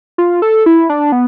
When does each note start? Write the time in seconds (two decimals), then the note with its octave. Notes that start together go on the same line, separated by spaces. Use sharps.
0.18 F4
0.42 A4
0.66 E4
0.89 D4
1.12 B3